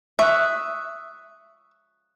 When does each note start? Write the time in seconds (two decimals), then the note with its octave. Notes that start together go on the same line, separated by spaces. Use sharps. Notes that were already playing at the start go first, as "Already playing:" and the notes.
0.19 E5 C#6 D#6 F#6